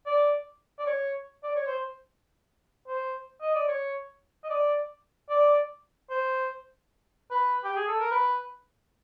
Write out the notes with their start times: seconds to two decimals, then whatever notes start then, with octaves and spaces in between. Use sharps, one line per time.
0.06 D5
0.79 D5
0.86 C#5
1.43 D5
1.55 C#5
1.67 C5
2.88 C5
3.41 D#5
3.55 D5
3.68 C#5
4.43 D#5
4.50 D5
5.30 D5
6.10 C5
7.31 B4
7.64 G4
7.76 G#4
7.88 A4
8.00 A#4
8.11 B4